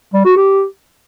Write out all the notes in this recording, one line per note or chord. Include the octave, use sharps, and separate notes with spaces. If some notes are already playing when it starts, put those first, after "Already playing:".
G3
F#4
G4